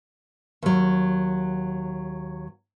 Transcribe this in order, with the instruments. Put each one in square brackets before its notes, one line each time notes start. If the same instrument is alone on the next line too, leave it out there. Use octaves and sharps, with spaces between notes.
[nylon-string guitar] D#2 F#3